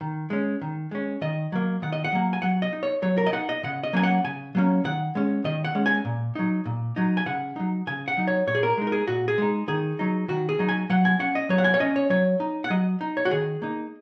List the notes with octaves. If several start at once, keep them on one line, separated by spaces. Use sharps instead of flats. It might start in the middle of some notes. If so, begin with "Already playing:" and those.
D#3
G#3 C#4
D#3
G#3 C#4
D#3 D#5
F#3 A#3
D#3 F#5
D#5
F#5
F#3 A#3
G#5
F#3 F#5
D#5
D#4
C#5
F#3 C#5
A#4
D#5
D#4 F#5
D#5
C#3 F#5
D#5
F#3 A#3 C#4 G#5
F#5
C#3 G#5
F#3 A#3 C#4
D#3 F#5
G#3 C#4
D#3 D#5
F#5
G#3 C#4
G#5
A#2
F#3 D#4
A#2
F#3 D#4
G#5
C#3 F#5
F#3 D#4
C#3 G#5
F#5
F#3 D#4
C#5
A#2 C#5
G#4
A#4
G#3 D#4
A#4
G#4
A#2 F#4
G#4
G#3 D#4
D#3 G#4
F#3 D#4
D#3 F#4
G#4
F#3 D#4
G#5
F#3 F#5
G#5
C#4 F#5
D#5
F#3 C#5
F#5
G#5
C#5
C#4 D#5
C#5
F#3 C#5
D#4
F#5
F#3 D#5
D#4
C#5
F#4
D#3 G#4
A#3 D#4